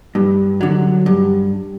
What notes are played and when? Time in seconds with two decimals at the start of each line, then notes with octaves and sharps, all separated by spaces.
0.15 G2
0.61 D3 F#3
1.06 G2